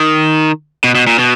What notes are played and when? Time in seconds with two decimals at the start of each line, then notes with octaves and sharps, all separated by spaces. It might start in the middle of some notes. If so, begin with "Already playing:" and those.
Already playing: D#3
0.84 B2
0.95 B2
1.07 A#2
1.19 B2